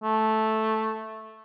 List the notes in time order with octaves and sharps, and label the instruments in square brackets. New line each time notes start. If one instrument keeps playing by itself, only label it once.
[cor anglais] A3